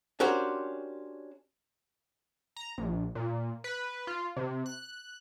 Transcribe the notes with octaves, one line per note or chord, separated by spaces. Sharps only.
C#4 D4 F#4 G4 A#4 C5
A#5
A#1
A#2
B4
F4
C3
F#6